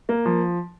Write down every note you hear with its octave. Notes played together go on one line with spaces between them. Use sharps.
A#3
F3